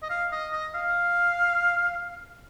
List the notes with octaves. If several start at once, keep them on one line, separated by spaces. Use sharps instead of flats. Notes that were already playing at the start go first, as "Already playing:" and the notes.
D#5
F5
D#5
D#5
F5